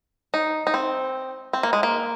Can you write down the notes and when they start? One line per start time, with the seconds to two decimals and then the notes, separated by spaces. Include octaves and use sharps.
0.34 D#4
0.67 D#4
0.74 C4
1.53 C4
1.63 A#3
1.73 G#3
1.83 A#3